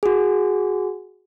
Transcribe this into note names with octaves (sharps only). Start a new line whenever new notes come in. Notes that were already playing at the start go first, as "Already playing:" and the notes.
F#4 G#4